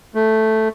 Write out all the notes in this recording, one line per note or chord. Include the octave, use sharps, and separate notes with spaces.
A3